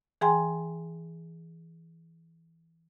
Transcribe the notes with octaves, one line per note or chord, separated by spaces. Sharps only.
E3 G#4 G5 G#5 A#5 C6